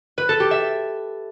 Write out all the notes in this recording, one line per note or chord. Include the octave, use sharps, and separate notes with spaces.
B4
A4
G4
E5